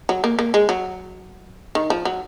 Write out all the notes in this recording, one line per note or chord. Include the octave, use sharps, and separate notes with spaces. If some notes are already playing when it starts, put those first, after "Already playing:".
F#3
A#3
A#3
G#3
F#3
D#3
F3
F#3